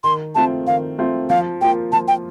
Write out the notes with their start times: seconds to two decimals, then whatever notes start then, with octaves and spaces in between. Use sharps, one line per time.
0.04 D#3 C6
0.35 A3 C4 F4 A5
0.67 D#3 F5
0.98 A3 C4 F4
1.30 F3 F5
1.61 A#3 F4 G5
1.92 F3 A5
2.08 G5